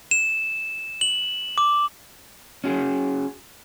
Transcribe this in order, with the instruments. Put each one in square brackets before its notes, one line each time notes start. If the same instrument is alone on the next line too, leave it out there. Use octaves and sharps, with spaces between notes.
[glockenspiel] E7
F#7
D6
[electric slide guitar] C#4 F#4 G#4